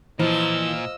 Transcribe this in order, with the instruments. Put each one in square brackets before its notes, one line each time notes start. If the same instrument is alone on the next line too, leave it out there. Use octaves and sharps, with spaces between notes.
[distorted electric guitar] A#2 [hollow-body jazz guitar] E3 [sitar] F3 [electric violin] D#5 E6